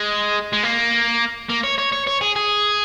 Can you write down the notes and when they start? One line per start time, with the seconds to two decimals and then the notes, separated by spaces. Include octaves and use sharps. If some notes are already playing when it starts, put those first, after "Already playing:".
Already playing: G#3
0.53 G#3
0.63 A#3
1.49 A#3
1.64 C#5
1.78 C#5
1.93 C#5
2.07 C#5
2.21 G#4
2.36 G#4